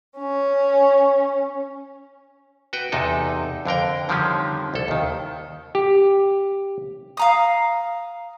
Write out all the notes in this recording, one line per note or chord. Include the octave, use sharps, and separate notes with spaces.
C#4
F#4 B4 G5
E2 C3 D#4 A4
F2 D3 A#4 G5
D3 D#3 F3 G3 C4 C#4
C2 A4
D#2 D#3
G4
F5 A#5 D#6